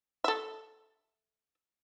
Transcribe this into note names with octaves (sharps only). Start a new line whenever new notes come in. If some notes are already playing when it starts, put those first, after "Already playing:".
A4 E5